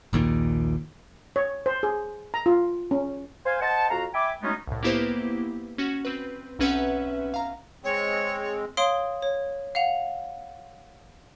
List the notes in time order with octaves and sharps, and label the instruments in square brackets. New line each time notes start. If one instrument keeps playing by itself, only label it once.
[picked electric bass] A#1 D#2 A#2 D#3
[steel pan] C#5
C5
G#4
A#5
F4
C#4
[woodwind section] C5 F5 G#5
C5 D#5 F#5 A5
F2 F#4 F5 A#5
E5 G5 G#5 B5 D6
F#3 G#3 A3 B3 C#4 D#4
[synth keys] C2 A2
A#3 B3 E4 G4 B4 C5
C#4 F#4
C4 B4
B1 C4 C#4 B4 E5 F#5
F5 A#5
[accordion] G#3 C4 [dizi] C#5
[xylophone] C#5 F5 C6 D#6 D7 G7
C#5
F5 F#5 F7